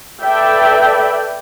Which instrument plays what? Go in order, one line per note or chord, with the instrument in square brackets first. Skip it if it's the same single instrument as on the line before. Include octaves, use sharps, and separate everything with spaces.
[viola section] A4 B4 D5 E5 G5